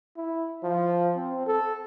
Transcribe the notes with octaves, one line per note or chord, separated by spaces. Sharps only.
E4
F3
C4
A4